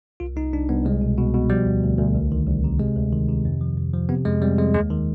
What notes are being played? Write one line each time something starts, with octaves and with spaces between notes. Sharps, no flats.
C2 F4
C2 D#4
C2 D4
C2 B3
C2 G#3
B2
B2
B2
F3 G3
D2
D2
D2
C2
D#3
C2
C3
C3 G#3
D2
D#3
C3
F2
F3
F2
F3
C3 B3
F2 G#3
F2 G3
F2 G#3
D#2 G#3
D#3